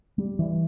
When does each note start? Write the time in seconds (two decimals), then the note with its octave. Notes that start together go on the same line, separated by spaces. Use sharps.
0.18 G3
0.39 E3